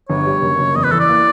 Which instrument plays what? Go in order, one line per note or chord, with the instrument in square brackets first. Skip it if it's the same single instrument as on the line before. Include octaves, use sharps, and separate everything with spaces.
[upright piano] G1 [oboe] C#5
[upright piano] G3
F#1
F#1
[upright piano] E2 [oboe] D#5
[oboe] B4
[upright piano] E3 [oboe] A4
[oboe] D5
[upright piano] A#3